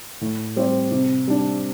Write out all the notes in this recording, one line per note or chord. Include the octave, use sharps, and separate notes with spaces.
A2
G3 C4 G4 C5
C3
G3 D4